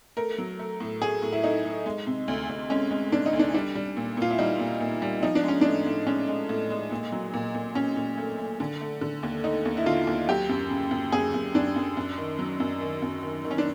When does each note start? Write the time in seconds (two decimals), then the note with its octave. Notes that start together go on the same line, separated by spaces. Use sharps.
0.17 A3 A#4
0.38 F#3
0.59 A3
0.80 A2
1.01 A3 G#4
1.22 A2
1.33 E4
1.43 A3 D#4
1.65 A3
1.86 G#3
2.07 C3
2.28 D2
2.49 D2
2.70 G#3 C#4
2.91 G#3
3.12 C3 D4
3.26 D#4
3.33 D2
3.39 D4
3.54 G3 D4
3.75 G3
3.97 A#2
4.17 A#2 F4
4.31 E4
4.38 G3 D#4
4.59 A#2
4.80 A#2
5.02 G3
5.23 F3 D#4
5.35 D4
5.44 G#3 C#4
5.61 A2 D4
5.86 A2
6.07 G#3 C#4
6.28 G#3
6.49 A2
6.70 G#3
6.91 A#2
7.12 F#3
7.34 A#2
7.55 A#2
7.75 A#2 C#4
7.96 A#2
8.18 A3
8.38 A3
8.60 D3
8.81 A3
9.01 D3
9.23 D#2
9.44 A3 D#4
9.65 D#2
9.77 E4
9.86 D3 F4
10.07 D#2
10.29 F#3 G4
10.49 F#2
10.70 C#3
10.91 F#2
11.12 F#2 G#4
11.34 F#2
11.55 F#2 D4
11.76 F#2
11.97 F#2
12.18 D#3
12.39 F#3
12.60 F#2
12.81 D#3
13.02 F#2
13.23 D#3
13.44 D#3
13.51 C#4
13.58 D4